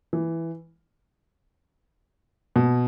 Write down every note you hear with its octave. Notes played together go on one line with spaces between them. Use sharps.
E3
B2